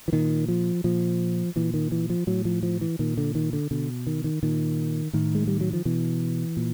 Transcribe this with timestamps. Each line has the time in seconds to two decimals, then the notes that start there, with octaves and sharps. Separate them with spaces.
0.08 E3
0.12 A#2 D#3
0.48 F3
0.84 A#2 F3
1.56 A#2 E3
1.74 D#3
1.92 E3
2.10 F3
2.27 A2 F#3
2.45 F3
2.63 F3
2.81 E3
2.99 A#2 D#3
3.18 D3
3.35 D#3
3.53 D3
3.71 B2 D3
4.07 D#3
4.24 D#3
4.43 A#2 D#3
5.13 A2 D#3
5.35 G#3
5.47 G3
5.61 F#3
5.73 F3
5.85 B2 E3
6.57 A#2